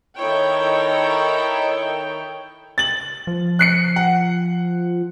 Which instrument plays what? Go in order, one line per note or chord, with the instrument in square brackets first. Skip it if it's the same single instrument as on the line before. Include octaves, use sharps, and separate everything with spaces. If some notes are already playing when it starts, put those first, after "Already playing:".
[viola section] D#3 D#4 E4 A4 C#5 G5
[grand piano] A6 F#7
[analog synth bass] F3
[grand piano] F#6 C7 C#7
F#5